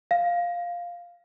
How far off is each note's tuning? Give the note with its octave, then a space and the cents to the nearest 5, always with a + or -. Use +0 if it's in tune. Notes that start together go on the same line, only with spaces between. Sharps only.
F5 +0